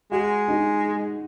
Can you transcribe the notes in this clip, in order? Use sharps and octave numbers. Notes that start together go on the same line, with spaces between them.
G#3 F#4
D#4